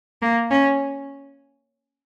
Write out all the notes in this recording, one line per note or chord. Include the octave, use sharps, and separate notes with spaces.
A#3
C#4